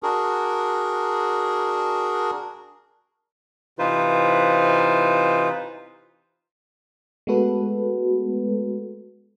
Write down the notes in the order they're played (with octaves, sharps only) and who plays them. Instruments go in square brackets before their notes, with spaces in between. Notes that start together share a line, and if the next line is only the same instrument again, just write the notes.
[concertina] D4 F#4 G#4 A#4
[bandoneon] C3 E3 D#4 F4 B4 C5
[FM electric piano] G#3 A3 B3 F#4 A4 B4